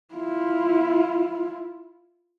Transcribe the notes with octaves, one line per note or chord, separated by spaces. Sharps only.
E4 F4